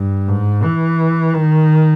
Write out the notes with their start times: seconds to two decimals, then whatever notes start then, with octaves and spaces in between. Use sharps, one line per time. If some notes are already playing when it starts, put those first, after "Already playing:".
Already playing: G2
0.28 G#2
0.63 E3
1.34 D#3